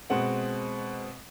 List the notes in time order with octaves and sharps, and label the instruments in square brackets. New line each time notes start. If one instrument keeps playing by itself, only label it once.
[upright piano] B2 G#3 C4 F#5